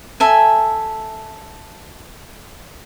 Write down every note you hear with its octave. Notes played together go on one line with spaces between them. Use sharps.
A4 E5 G#5